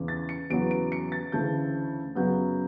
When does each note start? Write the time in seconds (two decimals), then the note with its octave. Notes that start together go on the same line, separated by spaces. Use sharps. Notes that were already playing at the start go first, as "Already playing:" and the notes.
Already playing: E2 C#3 E3
0.08 A6
0.29 C#7
0.50 E2 C#3 F#3 B3 D7
0.71 D7
0.92 C#7
1.12 A6
1.32 D2 C#3 E3 A3 G6
2.15 F#2 C#3 F#3 B3 G6